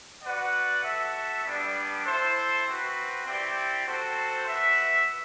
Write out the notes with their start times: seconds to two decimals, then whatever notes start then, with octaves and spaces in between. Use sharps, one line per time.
0.22 F#4 B4 D5 F#5
0.84 F#4 A4 E5
1.44 G3 B3 D4
2.05 E4 A4 C5
2.66 C4 F#4 B4
3.26 C4 E4 G4 D5 G5
3.87 C4 F#4 A4 C5
4.47 F#4 B4 E5